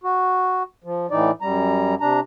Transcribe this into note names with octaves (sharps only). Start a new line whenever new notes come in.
F#4
F3
A2 E3 D#4 D5
F#2 G3 A#5
C3 D4 A#5